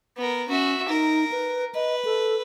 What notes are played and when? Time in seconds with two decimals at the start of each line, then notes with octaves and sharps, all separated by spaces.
0.17 B3 A#4
0.49 C#4 F#4 E5
0.89 D#4 A#4
1.32 B4
1.75 B4 D#5
2.05 A4